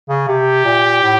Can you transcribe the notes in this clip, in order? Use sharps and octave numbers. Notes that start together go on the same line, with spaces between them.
C#3
C3 G4
A#2
A2